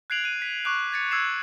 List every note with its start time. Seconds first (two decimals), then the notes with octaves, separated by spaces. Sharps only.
0.10 F#6 G#6 C7 D7 F7 F#7
0.24 F#6 D#7
0.42 B6
0.64 C#6 D6 F#6 D7
0.92 G#6 A6 C#7
1.11 E6 G#6 C7 E7